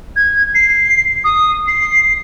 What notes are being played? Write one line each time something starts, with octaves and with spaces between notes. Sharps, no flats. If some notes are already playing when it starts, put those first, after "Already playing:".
G#6
C7
D#6
C7